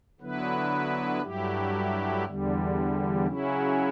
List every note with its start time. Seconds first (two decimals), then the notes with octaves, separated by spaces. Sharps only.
0.20 D3 F#3 B3 E4 B4
1.22 G2 F#3 A3 E4 G4
2.24 E2 D3 G3
3.26 C#3 F#3 C#4 E4